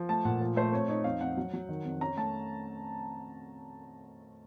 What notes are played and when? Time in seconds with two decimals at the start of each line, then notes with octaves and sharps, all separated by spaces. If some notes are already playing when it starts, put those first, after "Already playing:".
Already playing: F3
0.09 A3 A5
0.25 A#2 F#5
0.41 F3
0.56 A3 C5
0.72 C4 C#5
0.88 D#4 C#5
1.04 F2 F5
1.21 F2 F#5
1.37 F#3
1.53 F#3
1.69 D#3
1.85 F2
2.01 C#4 A#5
2.17 A3 A5